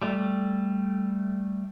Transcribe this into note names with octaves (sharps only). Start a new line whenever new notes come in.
G3 A3